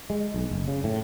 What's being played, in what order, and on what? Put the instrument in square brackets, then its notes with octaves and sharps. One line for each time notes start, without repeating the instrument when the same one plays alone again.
[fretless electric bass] G#3
B1
F#1
C#3
A2